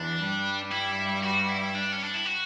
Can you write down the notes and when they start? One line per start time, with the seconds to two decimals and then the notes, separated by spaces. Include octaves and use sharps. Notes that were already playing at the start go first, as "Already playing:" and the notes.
Already playing: E2 E3 D4
0.21 G2 G3
0.71 E4
1.23 F#4
1.48 E4
1.74 D4
1.92 C#4
2.03 D4
2.14 E4
2.25 F#4